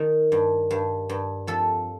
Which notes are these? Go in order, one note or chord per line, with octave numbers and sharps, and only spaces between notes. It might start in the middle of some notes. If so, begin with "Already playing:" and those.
Already playing: D#3
G2
G2
G2
F2 A4